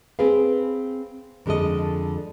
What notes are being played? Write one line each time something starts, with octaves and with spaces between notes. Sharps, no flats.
C4 G#4 B4 F5
F2 D3 G#3 A4 D#5